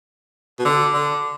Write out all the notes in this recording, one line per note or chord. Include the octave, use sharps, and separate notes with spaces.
B2
D3
D3